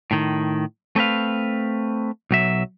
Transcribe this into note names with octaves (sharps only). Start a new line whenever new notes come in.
A2 D#3
A3 C4 B4 F5
B1 F#3 E5